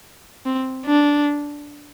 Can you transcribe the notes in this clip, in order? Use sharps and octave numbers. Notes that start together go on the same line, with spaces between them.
C4
D4